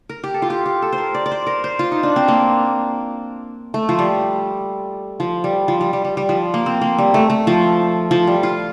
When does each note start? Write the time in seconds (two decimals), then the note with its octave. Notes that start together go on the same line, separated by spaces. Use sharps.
0.09 A#4
0.24 G4
0.34 A4
0.42 F4
0.50 G4
0.66 G4
0.82 A4
0.92 C5
0.98 A#4
1.14 D5
1.26 D5
1.31 C5
1.47 A#4
1.64 C5
1.79 F4
1.92 D#4
2.03 D4
2.16 C4
2.28 A#3
3.74 A3
3.89 F3
3.99 G3
5.20 F3
5.44 G3
5.68 F3
5.81 G3
5.93 G3
6.05 G3
6.17 G3
6.29 F3
6.54 A#3
6.66 C4
6.81 A#3
6.98 G3
7.14 A3
7.30 A3
7.47 F3
8.11 F3
8.27 G3
8.43 F4